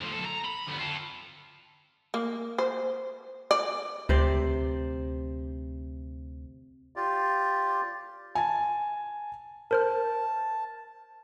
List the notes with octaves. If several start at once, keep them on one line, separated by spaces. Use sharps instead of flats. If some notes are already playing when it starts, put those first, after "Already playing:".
D2 F3
B1 A4
A#5
B5
D2 B3
F4 A4
A#3
C5
D5
D2 C3 C5 D5
F4 G4 D5
G#5 A5
A#4 C5 A5 F6